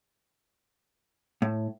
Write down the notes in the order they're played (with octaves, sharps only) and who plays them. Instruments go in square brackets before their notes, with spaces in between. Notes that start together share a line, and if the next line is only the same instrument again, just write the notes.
[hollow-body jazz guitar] A2